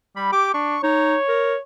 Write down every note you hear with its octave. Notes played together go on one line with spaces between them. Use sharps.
G3 B5
G4 D6
D4 C#6
D#4 C#5
A#4